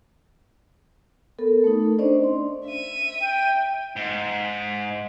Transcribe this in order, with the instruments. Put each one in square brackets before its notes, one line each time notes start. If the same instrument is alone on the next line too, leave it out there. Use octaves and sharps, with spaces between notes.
[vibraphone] B3 A4 A#4
A3 D#4
C#4 D4 C5 D5 D#5
C6
[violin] E5 D#7
[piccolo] G5
[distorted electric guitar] G#2